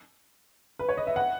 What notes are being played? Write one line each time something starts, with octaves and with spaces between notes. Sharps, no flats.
B4
C#5
D#5
E5
F#5